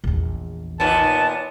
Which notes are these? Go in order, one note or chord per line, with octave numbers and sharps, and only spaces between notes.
A#1 E2
D#2 A#2 B3 A5